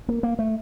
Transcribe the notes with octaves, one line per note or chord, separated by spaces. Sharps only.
A#3
A#3
A3